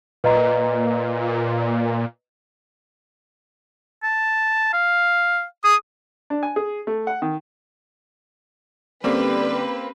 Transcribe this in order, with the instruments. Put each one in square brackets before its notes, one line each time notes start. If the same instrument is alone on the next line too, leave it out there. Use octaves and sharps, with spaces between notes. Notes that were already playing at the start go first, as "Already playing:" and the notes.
[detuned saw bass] A#2 [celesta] B4 D#5 A#5
[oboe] A5
F5
[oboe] G#4 [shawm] D#6
[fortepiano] D4
G#5
G#4
A3
F#5
D#3
[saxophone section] D3 G3 [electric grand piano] A#3 C4 [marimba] C#4 G4 C5 [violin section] B4